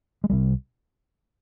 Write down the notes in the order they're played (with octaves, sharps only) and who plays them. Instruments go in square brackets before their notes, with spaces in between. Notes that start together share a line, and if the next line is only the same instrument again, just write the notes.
[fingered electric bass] G#3
C2 C3 G3